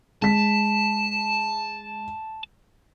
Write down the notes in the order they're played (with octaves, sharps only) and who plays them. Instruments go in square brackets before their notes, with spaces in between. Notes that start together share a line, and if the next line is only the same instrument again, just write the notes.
[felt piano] G#3 B6 [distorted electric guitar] A5